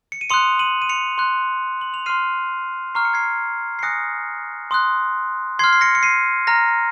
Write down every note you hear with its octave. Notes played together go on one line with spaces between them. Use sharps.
C#7
D#7
C6 D#6 F#6 C#7 F7
D#7 F#7
D#7
C#7 F7
C6 F#6
F#7
F7
C6 F6 C7 D#7
A#5 C#6 F6 C7
C#7
G#6 C7
C7
G#5 D#6 F#6 A#6 C#7
C6 D#6 F#6
C6 F6 G#6 C7
C7
A#6 C#7
C#7
C7 D#7
A#5 F6 A#6